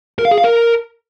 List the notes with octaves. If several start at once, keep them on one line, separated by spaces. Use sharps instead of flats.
A#4
F5
G#4
F5
A#4